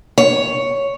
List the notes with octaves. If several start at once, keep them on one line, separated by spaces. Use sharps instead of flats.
C#5